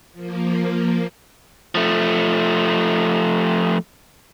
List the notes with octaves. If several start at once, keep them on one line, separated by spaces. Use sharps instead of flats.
F3 A#3
F3 A3